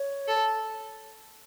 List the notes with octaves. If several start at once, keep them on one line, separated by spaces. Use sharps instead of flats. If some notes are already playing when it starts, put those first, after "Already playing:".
Already playing: C#5
A4